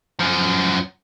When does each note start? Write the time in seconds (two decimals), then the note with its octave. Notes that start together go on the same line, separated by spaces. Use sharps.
0.20 F#2 F3